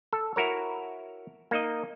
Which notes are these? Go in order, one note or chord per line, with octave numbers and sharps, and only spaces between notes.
A4
E4 F#4 A#4 C#5
A#3 D#4 D#5